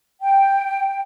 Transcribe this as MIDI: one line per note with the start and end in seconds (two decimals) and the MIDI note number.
0.21 1.01 79